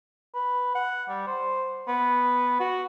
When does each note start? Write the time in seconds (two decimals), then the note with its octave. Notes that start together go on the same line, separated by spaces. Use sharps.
0.34 B4
0.75 F#5
1.09 G3
1.27 C5
1.88 B3
2.60 F#4